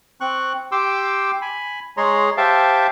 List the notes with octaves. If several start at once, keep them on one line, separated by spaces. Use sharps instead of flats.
C4 C#6 F#6
G4 G5 C6 D6 E6
G#5 B5
G#3 G#4 C#5 A#5 C6
G4 C5 E5 F5 G5 A5